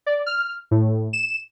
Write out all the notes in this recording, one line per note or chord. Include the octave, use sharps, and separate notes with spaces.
D5
F6
A2
E7